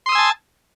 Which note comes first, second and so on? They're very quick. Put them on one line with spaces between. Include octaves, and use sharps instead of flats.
C6 D#6 E6 G#5 A5